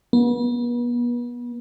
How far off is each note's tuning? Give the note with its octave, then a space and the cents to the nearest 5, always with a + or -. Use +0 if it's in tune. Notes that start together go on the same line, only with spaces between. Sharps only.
B3 -35